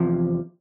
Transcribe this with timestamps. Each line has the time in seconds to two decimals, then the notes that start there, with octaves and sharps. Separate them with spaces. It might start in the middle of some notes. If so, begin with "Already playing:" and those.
Already playing: E2 C3 F3